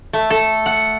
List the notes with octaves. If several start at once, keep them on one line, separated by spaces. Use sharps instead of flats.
A3
A4
F#5